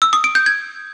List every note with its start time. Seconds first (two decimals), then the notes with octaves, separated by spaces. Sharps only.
0.02 E6
0.13 D#6
0.24 D7
0.35 G6
0.46 G#6